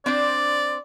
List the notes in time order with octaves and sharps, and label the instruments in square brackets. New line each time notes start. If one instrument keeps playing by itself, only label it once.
[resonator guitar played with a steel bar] C4 D4 C5 [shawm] D5